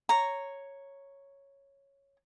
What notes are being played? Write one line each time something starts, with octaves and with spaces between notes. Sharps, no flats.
C#5 A#5